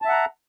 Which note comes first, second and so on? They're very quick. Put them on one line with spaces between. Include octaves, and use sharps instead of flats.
A5 E5 F#5 A#5